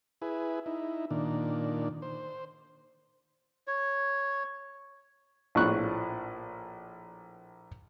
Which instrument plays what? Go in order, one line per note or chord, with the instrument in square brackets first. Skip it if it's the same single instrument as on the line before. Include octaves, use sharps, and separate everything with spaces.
[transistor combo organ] E4 G#4 B4
D#4 E4
A#2 D#3 D4
C5
[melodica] C#5
[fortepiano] A#1 A2 F3 D4 C#6 F#6